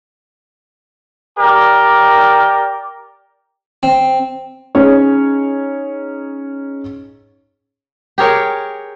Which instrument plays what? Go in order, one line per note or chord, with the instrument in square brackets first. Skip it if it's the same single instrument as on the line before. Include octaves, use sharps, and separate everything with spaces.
[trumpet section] G4 A#4 D5
[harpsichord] C4
[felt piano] C#4 D#4 G#4 C#5
[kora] G4 G#4 A#4 C#5